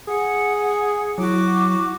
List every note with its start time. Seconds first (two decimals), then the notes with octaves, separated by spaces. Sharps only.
0.08 G#4 F#5
1.18 F#3 E4 F#4 D6